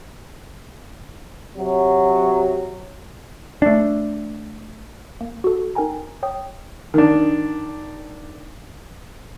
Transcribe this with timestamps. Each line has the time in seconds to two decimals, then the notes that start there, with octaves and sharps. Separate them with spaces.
1.56 C3 F#3
3.62 A3 D4
5.21 A#3
5.44 F#4 A4
5.75 D#4 A#4 G5 G#5 A#5
6.23 C#5 G5 D#6
6.94 D#3 D4